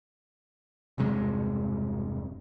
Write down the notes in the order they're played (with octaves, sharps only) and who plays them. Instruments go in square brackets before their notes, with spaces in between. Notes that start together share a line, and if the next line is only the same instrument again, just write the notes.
[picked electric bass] E1 G2 C3 G#3